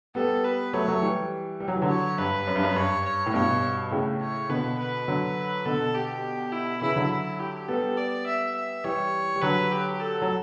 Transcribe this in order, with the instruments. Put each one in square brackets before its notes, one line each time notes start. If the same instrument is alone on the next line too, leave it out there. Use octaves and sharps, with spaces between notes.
[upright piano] G3 B3 [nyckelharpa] A4
[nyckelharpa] B4
[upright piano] F#3 A3 [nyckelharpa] C#5
[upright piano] F#3 A3
E3 G3
G3
F#3
E3
D3 F#3
[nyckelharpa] C#5
[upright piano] G2 [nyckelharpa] B4
[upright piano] F#2
G2
F#2
[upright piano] G2 [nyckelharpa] C#5
[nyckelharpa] C#5
[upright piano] A2
[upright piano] G2 B2 [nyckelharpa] C#5
[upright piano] A2 C#3
[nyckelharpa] C#5
[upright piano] B2 D3 [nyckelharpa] B4
[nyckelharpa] B4
[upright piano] D3 F#3
[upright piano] B2 D3 [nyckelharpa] A4
[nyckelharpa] G4
E4
[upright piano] C#3 E3 [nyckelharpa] E4
[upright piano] D3 F#3
[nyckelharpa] E4
G4
[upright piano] G3 B3 [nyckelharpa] A4
[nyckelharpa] D5
E5
E5
[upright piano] E3 G3 [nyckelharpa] C#5
[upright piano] G3
[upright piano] D3 F#3 [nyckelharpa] B4
[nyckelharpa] G4
A4
[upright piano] F#3